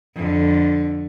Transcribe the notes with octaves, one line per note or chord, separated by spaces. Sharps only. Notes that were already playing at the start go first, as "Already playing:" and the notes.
F2 D3